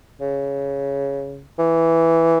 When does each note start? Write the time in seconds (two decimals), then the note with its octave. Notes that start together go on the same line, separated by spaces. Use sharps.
0.21 C#3
1.59 E3